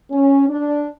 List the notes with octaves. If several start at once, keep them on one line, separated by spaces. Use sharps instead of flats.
C#4
D4